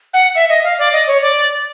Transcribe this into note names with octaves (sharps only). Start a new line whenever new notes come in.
F#5
E5
D#5
F5
D5
D#5
C#5
D5